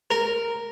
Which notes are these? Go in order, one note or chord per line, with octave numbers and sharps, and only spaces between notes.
A#4